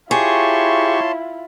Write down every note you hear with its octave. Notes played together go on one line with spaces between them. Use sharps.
E4 F4 G4 G#4 C#5 A5 C6 C#6